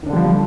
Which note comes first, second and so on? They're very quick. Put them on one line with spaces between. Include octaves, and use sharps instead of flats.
D#3 D4 D3 G3 F3